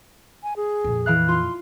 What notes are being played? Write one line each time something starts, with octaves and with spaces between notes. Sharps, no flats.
G#5
G#4
F2 A#2
E3 F5 F#6
F4 C6